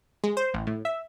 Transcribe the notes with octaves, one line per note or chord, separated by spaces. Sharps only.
G#3
C5
A1
A2
E5